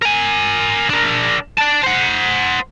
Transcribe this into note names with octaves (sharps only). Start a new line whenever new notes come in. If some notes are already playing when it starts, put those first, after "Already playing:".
A#4 G#5
D4 A#4
D5 A5
C5 F#5